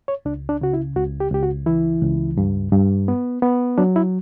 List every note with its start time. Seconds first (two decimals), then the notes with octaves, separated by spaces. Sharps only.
0.08 C#5
0.25 C#2 D4
0.49 D4
0.61 C#3 F#4
0.74 E4
0.96 C#2 F#4
1.20 G4
1.31 C#2 G4
1.43 F#4
1.66 E3 E4
2.02 C#2
2.37 G2
2.72 G2
3.08 B3
3.42 B3
3.78 F#3 D4
3.96 E4